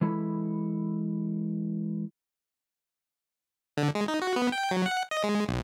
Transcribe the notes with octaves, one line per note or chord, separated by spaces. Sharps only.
E3 G#3 E4 A4 B5
D3
G#3
D#4
F#4
B3
G5
F#3
F#5
D#5
G#3
B1